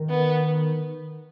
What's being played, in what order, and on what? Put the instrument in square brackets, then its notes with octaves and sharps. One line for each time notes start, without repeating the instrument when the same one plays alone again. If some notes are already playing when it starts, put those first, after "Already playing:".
Already playing: [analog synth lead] D#3
[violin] B3